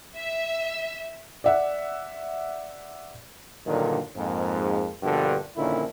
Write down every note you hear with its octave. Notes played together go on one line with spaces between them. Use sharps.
E5
D5 E5 F#5
G2 A#2 D3 D#3 F#3
F2 G#2 A#3
G2 B2 D3 F3 A#3 G4
A#1 A#2 D3 D#3 C#4 E4